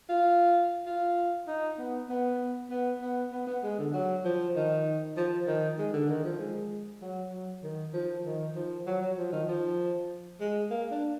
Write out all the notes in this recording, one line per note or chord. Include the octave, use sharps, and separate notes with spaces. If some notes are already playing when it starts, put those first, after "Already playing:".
F4
F4
D#4
B3
B3
B3
B3
B3
B3
G#3
D3
F#3
F3
D#3
F3
D#3
G#3
D3
D#3
F3
G#3
F#3
F#3
D#3
F3
D#3
F3
F#3
F#3
F3
D#3
F3
G#3
A#3
D4